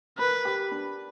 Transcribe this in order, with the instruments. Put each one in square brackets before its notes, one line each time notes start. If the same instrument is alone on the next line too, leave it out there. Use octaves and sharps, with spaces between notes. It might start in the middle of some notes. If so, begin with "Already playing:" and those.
[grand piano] A#4 [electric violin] B4
[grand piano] G4
D4